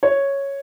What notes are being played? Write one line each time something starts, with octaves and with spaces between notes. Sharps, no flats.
C#5